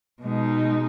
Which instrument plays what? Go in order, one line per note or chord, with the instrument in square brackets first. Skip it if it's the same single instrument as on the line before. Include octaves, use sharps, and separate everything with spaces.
[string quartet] B2 G#3 D#4